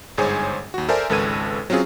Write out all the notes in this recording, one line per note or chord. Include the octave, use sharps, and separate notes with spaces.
G1 G#2 G#4 C5 C#5 G#5
D#2 F#4
A4 A#4 C5 D5 E5 G#5
G#1 C#2 A4 B4 G#6 D#7
F#3 C4 C#4 F4 G#4